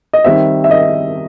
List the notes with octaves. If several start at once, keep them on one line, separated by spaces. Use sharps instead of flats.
D#5
D#3 G3 C4 E5
E5
D#5